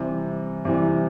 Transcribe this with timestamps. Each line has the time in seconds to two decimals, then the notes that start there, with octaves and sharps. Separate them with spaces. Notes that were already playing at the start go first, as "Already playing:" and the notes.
Already playing: C3 E3 G3
0.65 C3 E3 G3